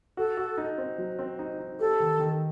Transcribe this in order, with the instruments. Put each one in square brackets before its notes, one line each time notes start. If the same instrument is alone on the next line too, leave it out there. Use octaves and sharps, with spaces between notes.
[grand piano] F#4 [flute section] A4
[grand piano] F#4
D#4
C4
F#3
C4
D#4
D#4
[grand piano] G4 [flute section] A4
[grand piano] D#3
D#3